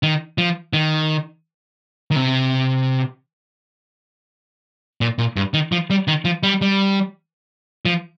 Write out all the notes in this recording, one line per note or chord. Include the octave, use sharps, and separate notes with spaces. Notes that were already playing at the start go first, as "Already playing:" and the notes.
D#3
F3
D#3
D#3
C3
A#2
A#2
G2
D#3
F3
G3
D#3
F3
G3
G3
F3